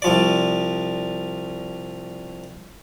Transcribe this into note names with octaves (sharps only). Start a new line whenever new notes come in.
C2 F3 D5